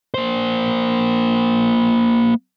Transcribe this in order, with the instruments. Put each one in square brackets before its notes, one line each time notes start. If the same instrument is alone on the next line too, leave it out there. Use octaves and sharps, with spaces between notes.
[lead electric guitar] A#3 C5